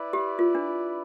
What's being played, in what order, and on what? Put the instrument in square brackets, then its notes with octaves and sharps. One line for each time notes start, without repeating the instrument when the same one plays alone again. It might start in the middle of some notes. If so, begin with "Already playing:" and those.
Already playing: [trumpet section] E4 B4 D5
[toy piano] G4
F4
D4